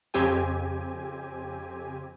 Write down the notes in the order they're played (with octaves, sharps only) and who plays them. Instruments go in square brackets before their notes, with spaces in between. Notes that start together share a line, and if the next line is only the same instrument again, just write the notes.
[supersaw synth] F2 C#3 C4 G4 G#5